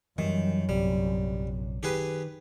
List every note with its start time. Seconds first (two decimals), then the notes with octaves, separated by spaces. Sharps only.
0.18 F#2 D#3 E3 G3
0.69 A#1 C3 G3
1.83 D#3 G4 G#4 B4